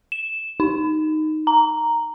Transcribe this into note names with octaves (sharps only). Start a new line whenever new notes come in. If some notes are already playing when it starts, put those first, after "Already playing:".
E7
D#4
A#5